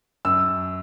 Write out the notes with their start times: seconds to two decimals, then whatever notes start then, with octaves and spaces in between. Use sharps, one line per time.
0.25 F#2 E6